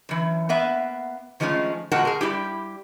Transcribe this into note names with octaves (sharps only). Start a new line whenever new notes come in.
F#2 E3
A#3 B3 E5 F5
D#3 F3 G#3 A3 C#4
A#2 G#3 F#4 A#4 F#5 A5
G#4 A#4
G3 G#3 E4 G4